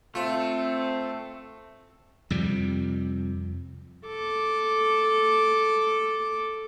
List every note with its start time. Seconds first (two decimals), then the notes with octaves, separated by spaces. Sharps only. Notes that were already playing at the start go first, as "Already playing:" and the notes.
0.15 A3 C4 F4 A4 E5
2.30 F2 C3 G3
4.07 A4 D6